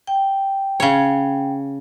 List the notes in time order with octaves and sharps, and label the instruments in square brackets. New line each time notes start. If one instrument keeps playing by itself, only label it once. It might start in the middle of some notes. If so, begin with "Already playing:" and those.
[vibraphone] G5
[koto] C#3 C#5